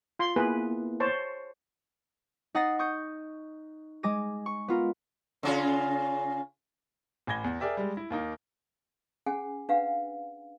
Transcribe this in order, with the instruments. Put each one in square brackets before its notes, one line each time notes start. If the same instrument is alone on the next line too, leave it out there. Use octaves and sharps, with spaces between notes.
[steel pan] F4 C6
[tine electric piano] A#3 B3 E4 [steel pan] G#4 B4
[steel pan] C5 C#5 A5
[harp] D#4 F#5 D#6 A6 A#6 C7
C#6 D#6 G6 C#7
G#3 G#5 D6 A#6 D#7
C#6
B3 F4 A#4
[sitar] C#3 C#4 F4
[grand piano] A1 G#5 B5 G#6 A#6 G7
E2
G#4 A#4 D5 E5 G5
G3 G#3
E4
D#2 A#3 D#4
[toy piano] C#4 G#4 F#5 G#5
D4 B4 F5 F#5